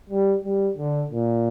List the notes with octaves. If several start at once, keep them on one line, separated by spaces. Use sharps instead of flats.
G3
G3
D3
A#2